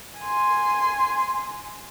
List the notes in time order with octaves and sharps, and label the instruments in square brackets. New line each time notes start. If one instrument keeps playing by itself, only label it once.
[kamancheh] G#5 C6